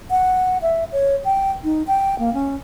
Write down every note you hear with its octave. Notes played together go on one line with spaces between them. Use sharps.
F#5
E5
C#5
G5
D#4
G5
A#3
C#4